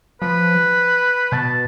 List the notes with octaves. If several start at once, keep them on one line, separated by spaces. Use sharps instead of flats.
F3 B4
B2 A5